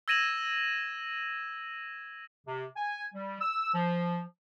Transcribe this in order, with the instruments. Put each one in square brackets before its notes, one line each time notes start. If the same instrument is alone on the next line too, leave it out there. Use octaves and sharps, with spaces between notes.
[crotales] E6 G#6 A#6 D#7 E7 F#7
[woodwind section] C3
G#5
G3
E6
F3